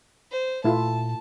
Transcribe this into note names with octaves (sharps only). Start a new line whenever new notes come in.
C5
A#2 A3 E4 F4 A5